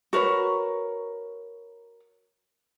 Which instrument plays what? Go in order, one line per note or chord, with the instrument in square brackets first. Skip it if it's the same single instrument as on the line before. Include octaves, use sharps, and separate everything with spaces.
[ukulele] F#4 A#4 B4 C#5